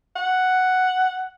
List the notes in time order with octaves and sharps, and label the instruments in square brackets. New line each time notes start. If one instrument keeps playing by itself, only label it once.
[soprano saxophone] F#5